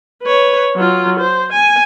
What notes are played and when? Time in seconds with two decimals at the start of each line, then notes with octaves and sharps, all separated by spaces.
0.23 B4 C#5
0.76 F#3 F4
1.19 C5
1.52 G#5